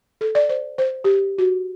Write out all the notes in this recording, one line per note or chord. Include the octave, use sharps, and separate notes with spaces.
A4
D5
C5
C5
G4
F#4